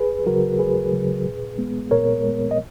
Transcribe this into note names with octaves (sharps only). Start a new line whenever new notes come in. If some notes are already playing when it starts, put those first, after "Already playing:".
Already playing: D#2 G#4 B4
C#3 F#3 F#4 A#4
D#2 G#4 B4
C#3 F#3
A#2
G#3 B3
A#2 A#4 C#5
G#3 B3
D#5